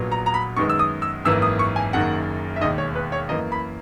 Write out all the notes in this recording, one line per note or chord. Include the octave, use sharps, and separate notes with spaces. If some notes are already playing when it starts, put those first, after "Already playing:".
Already playing: A#1 A#2 F#3 B3
A#5
A#5
B5
F#2 D#3 G#3 B3 C#6
E6
D#6
E6
G#1 F#2 E3 A#3 E6
D#6
C#6
G#5
F#1 F#2 D#3 A#3 F#5
E5
E1 D#2 D#3 D#5
C#5
B4
C#5
F#2 E3 A#3 D#5
B5